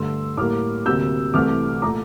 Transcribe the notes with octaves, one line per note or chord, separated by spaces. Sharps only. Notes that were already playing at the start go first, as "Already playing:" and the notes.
Already playing: G2 D3 A3 C6 E6
A2 G3 A#3 D6 F6
D2 C3 G3 A#3 E6 G6
C2 C3 E3 A3 D6 F6
A#2 A3 A#5 D6